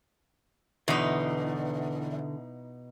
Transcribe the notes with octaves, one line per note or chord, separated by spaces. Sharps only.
E2 B2 D3 D#4